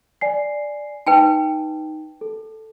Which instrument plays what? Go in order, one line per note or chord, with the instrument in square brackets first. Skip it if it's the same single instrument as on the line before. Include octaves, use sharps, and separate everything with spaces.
[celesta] D5 G#5 C7
[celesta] D#4 [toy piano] B4 G5 A5
[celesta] A4